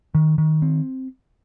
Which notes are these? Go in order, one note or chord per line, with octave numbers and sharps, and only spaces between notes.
D#3
D#3
C4